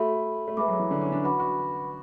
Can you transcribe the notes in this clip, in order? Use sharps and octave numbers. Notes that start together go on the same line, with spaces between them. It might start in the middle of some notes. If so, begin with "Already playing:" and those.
Already playing: A3 F#4 A4 E5 B5
A3
G#3 B4 E5 B5 D6
F#3
E3
D3
C#4
D4
F#4 B4 F#5 B5 D6
F#4